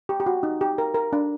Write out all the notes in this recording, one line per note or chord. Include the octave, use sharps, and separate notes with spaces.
G4
G4
F#4
D#4
G4
A#4
A#4
D4